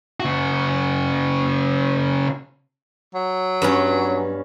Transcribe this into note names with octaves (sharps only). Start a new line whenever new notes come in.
C#3 F#4
F#3
G2 B3 C#4